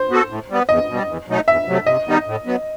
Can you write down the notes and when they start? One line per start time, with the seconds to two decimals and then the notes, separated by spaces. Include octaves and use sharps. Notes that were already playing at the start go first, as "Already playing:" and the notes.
Already playing: C5
0.10 B3 F#4 A4
0.29 A2
0.49 G3 B3
0.69 E2 D#5
0.89 B2 G3
1.08 E2
1.28 B2 F#3 A3 D#4
1.48 E2 E5
1.68 C3 F#3 A3
1.86 C3 D#5
2.07 D#3 G3 B3 D#4
2.26 A2
2.46 F#3 B3